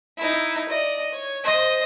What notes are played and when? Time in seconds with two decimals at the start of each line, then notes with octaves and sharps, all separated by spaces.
0.17 D#4 E4
0.69 D5 D#5
1.12 C#5
1.44 C5 D#5